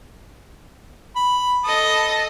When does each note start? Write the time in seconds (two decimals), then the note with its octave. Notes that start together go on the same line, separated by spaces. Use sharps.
1.16 B5
1.64 A4 D#5 D#6